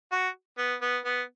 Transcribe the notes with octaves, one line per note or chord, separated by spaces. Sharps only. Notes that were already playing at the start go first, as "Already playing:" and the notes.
F#4
B3
B3
B3